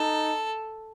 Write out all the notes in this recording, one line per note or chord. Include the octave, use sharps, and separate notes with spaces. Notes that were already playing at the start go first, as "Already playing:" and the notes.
Already playing: D#4 A4